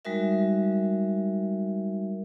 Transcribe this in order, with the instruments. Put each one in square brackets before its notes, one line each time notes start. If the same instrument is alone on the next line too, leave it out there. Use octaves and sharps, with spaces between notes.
[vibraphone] G3 G#3 D#4 F#4 A#4 E5